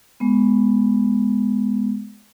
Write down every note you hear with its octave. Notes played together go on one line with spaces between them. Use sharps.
G#3 B3